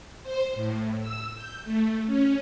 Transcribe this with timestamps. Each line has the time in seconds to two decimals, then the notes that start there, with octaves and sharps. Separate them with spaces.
0.22 C5
0.55 A2
0.99 E6
1.34 G6
1.64 A3
2.06 C#4